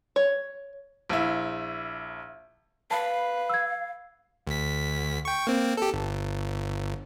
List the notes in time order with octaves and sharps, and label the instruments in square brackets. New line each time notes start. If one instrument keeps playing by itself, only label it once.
[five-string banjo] C#5
[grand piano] A#1 E4
[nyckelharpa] B4 [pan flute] F5 [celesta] A5
[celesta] E6 G#6
[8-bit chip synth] D2 B6
G5 C#6
A#3 C4
G4 A4
G1